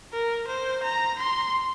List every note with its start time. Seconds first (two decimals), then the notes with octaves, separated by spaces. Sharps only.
0.12 A#4
0.47 C5
0.83 A#5
1.19 C6